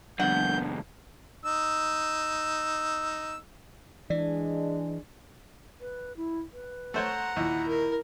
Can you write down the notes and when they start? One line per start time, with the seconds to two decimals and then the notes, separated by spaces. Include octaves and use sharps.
0.20 C#2 F#2 B3 D4 F#5 G6
1.45 D#4 E6
4.10 E3 G#3 D4 D5
5.81 B4
6.17 E4
6.53 B4
6.94 A3 C5 C#5 F#5 A#5
7.36 D#2 A#2 E4
7.68 A#4